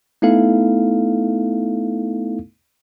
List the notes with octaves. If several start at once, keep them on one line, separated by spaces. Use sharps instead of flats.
A3 B3 D#4 E4 A4 F5